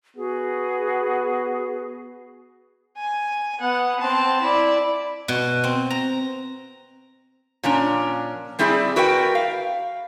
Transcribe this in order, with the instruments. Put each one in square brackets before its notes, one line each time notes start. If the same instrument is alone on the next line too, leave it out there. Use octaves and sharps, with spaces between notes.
[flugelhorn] B3 [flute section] F#4 G#4
[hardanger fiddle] G#5
B3 F#5
C4 A5
E4 D5
[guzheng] B2
C4
A#5
[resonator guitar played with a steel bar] A#2 F3 C#4 D4 A#5
G3 C4 E4 G#4 C5 D5
F#4 A#4 B4 D5 E5 G5
F5